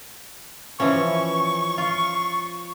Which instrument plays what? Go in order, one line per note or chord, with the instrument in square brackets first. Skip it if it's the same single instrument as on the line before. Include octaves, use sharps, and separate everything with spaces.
[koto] E3 F3 C#4 [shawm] C#6
[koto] F4